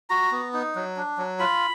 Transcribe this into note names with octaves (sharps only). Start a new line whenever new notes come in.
F#4 A#5
B3
D#4
F#3
D4
F#3
F4 B5